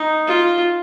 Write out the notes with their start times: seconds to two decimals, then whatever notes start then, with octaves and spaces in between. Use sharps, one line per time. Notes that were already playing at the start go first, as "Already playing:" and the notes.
Already playing: D#4
0.27 F4